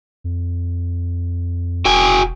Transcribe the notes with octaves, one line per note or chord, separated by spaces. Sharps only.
F2
E1 F#4 G5 G#5